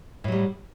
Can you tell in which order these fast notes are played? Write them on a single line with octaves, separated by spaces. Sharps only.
A2 F#3 G3